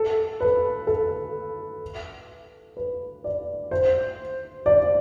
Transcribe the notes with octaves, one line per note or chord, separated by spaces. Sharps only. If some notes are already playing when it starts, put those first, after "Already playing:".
Already playing: A4
B4
A4
B4
D5
C5
D5